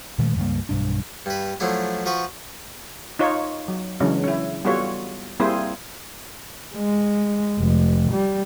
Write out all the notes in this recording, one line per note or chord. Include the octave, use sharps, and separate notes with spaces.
A#2 D#3 G#3 A3
C#2 G2 G3 A#3
B1 G2 D4
G2 B4
F3 F#3 A3 D4 E4
F3 F#4 B4 C#6
D#4 F4 C#5
F#3
C#3 E3 F#3 G#3 C#4 D4
C#4 E4
G3 B3 F4 F#4 A4 C#5
G3 A#3 C4 E4 G#4 C5
G#3
F1
G3